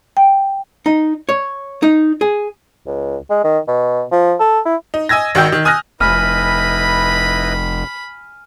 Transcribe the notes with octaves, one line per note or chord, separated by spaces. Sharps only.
G5
D#4
C#5
D#4
G#4
C#2
G#3
D#3
B2
F3
A4
E4
D#4
D#5 G#5 E6 G#6 A#6
G#1 D#3 F#4 G5 E6 G6
D#3
G#5 D#6 F6 F#6 A#6
F1 E4 B4 D#5 G#5 B5 F6 D#7